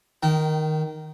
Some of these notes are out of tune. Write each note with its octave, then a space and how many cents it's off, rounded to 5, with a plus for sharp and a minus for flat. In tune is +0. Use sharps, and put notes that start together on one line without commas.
D#3 +0 G5 -35